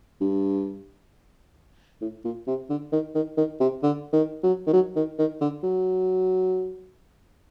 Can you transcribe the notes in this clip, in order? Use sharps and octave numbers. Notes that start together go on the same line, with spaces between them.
G2
A2
A#2
C3
D3
D#3
D#3
D#3
C3
D3
D#3
F#3
D#3
F#3
D#3
D#3
D3
F#3